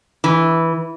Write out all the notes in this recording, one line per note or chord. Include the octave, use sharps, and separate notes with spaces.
E3